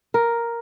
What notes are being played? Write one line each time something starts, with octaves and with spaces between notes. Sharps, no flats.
A#4